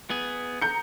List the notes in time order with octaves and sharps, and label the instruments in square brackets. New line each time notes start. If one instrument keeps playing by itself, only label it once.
[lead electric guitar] B3 G#4
[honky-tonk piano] A#5 G6 C#7